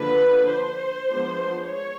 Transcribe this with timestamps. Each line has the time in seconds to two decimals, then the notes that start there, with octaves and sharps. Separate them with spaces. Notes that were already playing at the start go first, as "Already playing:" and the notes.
Already playing: D3 F3 A#3 D4 B4
0.50 C5
1.09 F3 G#3 B3 D4
1.65 C#5